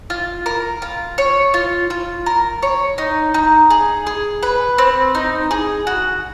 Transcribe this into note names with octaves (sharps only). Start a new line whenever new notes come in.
F4
A#4
F4
C#5
F4
F4
A#4
C#5
D#4
D#4
G#4
G#4
B4
C4
D#4
G#4
F#4